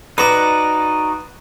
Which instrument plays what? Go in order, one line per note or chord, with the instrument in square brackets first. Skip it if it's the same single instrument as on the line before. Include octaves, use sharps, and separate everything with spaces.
[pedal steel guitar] D#4 F#4 D5 [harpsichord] B4 A#5